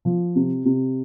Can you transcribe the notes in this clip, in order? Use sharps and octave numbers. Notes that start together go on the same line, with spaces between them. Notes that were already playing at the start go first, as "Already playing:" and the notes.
F3
C3
C3